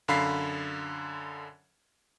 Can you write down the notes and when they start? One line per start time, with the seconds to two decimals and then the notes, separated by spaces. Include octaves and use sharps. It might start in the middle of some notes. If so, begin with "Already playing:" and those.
0.08 F#2 D3 F5 B5 B6 C7